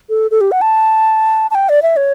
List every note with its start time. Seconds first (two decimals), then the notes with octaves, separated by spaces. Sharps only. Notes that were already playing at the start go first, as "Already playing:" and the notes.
0.10 A4
0.31 A4
0.41 G4
0.52 F#5
0.61 A5
1.51 A5
1.55 G5
1.69 D5
1.82 E5
1.97 C#5